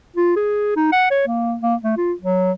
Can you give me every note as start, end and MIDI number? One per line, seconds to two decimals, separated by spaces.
0.17 0.36 65
0.36 0.72 68
0.76 0.88 63
0.92 1.06 78
1.11 1.27 73
1.27 1.57 58
1.62 1.75 58
1.83 1.96 57
1.97 2.13 65
2.22 2.52 54